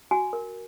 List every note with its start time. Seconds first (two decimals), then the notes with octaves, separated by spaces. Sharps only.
0.11 F#4 G#5
0.33 A#4